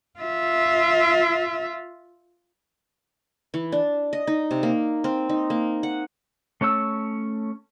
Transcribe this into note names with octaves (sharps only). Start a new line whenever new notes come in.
F4 E5
E3
D4
D#5
D#4
C3
A#3
C4
D#4
A#3
F#5
A3 C#4 C#5 A5 E6